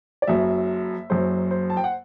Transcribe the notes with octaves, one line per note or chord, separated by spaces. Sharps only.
D5
F#1 F#2 F#3 E5
F#1 F#2 F#3 C5
C5
A5
G5
F#5